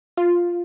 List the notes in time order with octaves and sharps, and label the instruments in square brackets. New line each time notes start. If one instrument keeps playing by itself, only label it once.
[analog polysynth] F4